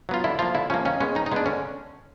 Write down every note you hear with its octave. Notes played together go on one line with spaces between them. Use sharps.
F#3 B3 F4
D3 E4
F3 A#3 F4
D3 E4
F3 A#3 C#4
D#3 C#4
G#3 B3 C#4
D#3 D#4
D#4
G#3 B3 D4
D3 C#4